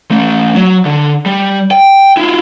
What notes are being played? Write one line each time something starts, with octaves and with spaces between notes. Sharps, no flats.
A3 C#4
F#3
D3
G3
G5
E4 F4